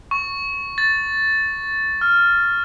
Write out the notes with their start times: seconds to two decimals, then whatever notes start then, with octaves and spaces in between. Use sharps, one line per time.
0.11 C#6
0.78 A6
2.01 F6